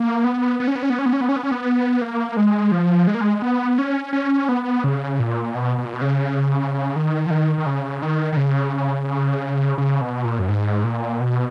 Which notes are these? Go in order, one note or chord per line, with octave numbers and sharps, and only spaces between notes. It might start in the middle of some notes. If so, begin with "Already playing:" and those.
Already playing: A#3
B3
B3
C#4
B3
C#4
B3
C#4
B3
C#4
B3
C#4
B3
C#4
B3
A#3
G#3
F3
G#3
A#3
G#3
B3
C#4
C#4
B3
C#3
A#2
B2
B2
A#2
B2
C#3
D#3
F3
D#3
D#3
C#3
D#3
D#3
C#3
C#3
B2
A#2
F#2
G#2
A#2
B2